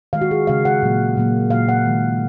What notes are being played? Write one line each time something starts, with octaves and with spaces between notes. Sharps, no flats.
D#3 G#3 F5
F#4
G#4
C#3 G#3 F5
F#5
A#2 F#3 A#3
A#2 F#3 A#3
A#2 F#3 A#3 F5
F#5
D#3 G#3